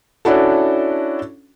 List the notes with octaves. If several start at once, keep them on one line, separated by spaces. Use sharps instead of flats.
C#4 D4 E4 F#4 A4